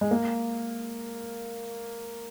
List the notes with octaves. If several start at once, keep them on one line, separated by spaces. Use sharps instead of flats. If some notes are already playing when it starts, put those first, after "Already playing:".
G#3
A#3